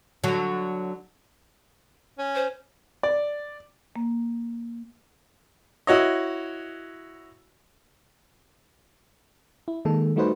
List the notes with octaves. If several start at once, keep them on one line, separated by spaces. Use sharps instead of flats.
D3 F#3
C#4
C5
D5
A#3
E4 F#4 C#5 D#5
E4
D#3 G#3 A#3 A4
G3 A3 D#4 F#4 B4 C5